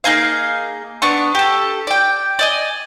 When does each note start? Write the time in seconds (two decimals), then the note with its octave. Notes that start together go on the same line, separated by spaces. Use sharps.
0.04 A#3 D#4 G#4 F5
1.02 B3 D4 C#6
1.35 G4 A4
1.87 D5 G5
2.39 D5 D#5 G#5